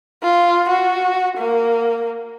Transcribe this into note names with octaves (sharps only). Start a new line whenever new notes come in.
F4
F#4
A#3